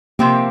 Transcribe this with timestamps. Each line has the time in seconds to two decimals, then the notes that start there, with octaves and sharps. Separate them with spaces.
0.19 C3 F3 A#3 C4 G4